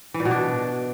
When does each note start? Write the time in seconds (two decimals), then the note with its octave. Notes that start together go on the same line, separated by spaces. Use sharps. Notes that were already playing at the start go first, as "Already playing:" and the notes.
0.14 E3
0.20 A#2
0.25 B2
0.31 D4